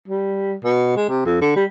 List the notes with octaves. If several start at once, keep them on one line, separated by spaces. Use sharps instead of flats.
G3
B2
G#3
C3
F2
D3
G3